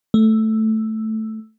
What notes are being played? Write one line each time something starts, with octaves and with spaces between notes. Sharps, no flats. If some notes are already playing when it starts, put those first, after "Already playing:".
A3